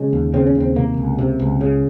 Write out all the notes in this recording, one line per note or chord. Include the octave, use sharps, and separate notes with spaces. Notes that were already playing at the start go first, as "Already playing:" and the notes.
Already playing: C#3 G#3
D#2
C#3 C4
C#4
D#2
C4
C3 A#3
C#2
C3
C#2
C#3